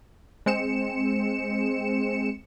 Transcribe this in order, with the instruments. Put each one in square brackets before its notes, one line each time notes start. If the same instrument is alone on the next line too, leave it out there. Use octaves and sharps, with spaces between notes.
[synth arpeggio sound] G#3 C4 C#7 E7